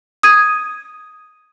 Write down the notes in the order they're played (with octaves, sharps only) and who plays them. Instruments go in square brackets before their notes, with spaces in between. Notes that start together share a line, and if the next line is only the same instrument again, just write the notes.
[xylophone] D#6 G#6 D#7